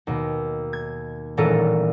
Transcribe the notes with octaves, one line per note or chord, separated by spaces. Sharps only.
D#2 B2
G#6
D#1 A1 A#2 A4 A#4 D#7